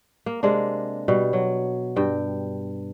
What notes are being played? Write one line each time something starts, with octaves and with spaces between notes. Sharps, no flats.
A#3
C3 G#3 A#3 D4
B2 G3
F#3
G2 G5